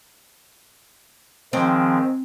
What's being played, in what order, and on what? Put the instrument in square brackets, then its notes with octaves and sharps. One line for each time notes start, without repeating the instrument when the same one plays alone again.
[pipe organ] D#3 F3 G#3 [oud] C4